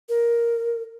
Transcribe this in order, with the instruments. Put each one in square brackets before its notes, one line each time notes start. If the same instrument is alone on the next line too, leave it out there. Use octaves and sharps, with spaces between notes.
[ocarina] A#4